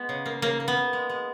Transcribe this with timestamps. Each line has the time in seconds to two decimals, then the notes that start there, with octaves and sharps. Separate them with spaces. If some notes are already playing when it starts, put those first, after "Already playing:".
Already playing: G#3 B3
0.09 C#3
0.26 A#3
0.42 C#3 A#3
0.60 A#3
0.68 B3
0.77 A#3
0.93 G#3
1.10 G#3